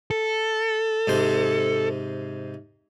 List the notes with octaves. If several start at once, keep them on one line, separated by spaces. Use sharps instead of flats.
A4
G#2 C3 C5